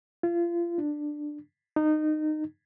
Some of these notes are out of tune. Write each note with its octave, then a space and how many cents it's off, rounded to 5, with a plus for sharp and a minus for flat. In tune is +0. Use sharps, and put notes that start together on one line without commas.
F4 -30
D4 +10
D#4 -20